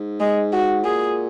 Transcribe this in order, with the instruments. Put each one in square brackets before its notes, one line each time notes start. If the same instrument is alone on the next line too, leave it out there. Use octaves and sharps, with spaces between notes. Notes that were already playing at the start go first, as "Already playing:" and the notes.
Already playing: [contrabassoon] G#2
[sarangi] G#3
F#4
[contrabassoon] A#2 [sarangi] G#4